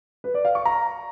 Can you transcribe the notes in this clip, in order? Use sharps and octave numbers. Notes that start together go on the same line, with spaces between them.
B4
D5
F5
C#6
A#5